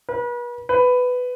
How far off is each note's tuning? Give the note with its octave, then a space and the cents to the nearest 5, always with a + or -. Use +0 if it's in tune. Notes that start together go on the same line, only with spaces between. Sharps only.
B4 -40
B4 +10